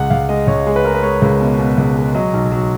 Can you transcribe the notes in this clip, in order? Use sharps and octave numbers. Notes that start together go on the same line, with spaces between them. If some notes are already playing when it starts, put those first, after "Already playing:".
Already playing: C#2 F#5
C#2 F5
G#3 D#5
C#2 C#5
G#3
B4
G#3 A#4
B4
G#3 C#5
C#2
B2
B2
C#2
G#3
F#3 D#5
B1
F#3